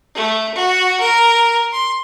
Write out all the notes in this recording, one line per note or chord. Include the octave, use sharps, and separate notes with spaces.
A3
F#4
A#4
C6